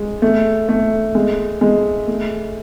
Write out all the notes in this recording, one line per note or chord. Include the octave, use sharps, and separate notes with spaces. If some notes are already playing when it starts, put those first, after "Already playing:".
Already playing: G#3
A3
A3
G#3
G#3
A3